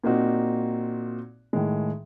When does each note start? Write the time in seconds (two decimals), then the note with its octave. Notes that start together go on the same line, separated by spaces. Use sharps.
0.04 A#2 A#3 C4 D#4 F#4
1.53 A2 D#3 G#3